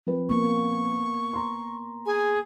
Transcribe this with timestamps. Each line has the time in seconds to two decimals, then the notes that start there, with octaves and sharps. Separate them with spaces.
0.07 F3 C4 B4
0.29 A#3 B3 C#6
1.33 A#5 C6
2.06 G#4 G#5